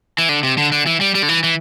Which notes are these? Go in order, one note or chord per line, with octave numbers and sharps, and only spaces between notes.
E3
D3
C3
D3
D3
E3
G3
G3
D3
E3
E3